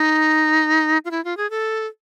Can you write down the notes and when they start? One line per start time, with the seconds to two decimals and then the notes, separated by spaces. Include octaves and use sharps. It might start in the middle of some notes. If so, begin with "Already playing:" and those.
Already playing: D#4
1.05 F4
1.11 E4
1.25 F4
1.37 G#4
1.50 A4